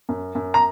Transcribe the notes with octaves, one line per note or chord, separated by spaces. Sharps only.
F#2
F#2
A#5